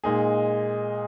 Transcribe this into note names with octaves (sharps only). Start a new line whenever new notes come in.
A#2 G#3 D#4 G#4